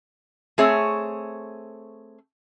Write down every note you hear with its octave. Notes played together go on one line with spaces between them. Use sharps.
A3 C4 G#4 C#5 E5